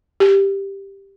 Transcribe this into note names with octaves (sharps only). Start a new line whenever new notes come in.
G4